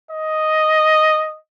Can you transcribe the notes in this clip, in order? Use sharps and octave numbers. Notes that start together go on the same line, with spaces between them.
D#5